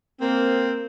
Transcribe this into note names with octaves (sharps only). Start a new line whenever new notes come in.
A#3 C4